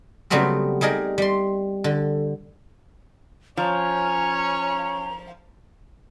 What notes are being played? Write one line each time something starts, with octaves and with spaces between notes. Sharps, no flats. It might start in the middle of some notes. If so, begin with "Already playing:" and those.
C#3 F#3 G3 A3 B3 C4
G3 D#4 G#4 A#4
G3 C6
D3
F3 C#4 C#5 A#5